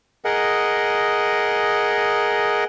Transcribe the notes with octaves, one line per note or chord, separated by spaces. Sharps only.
G#4 A#4 D#5 F#5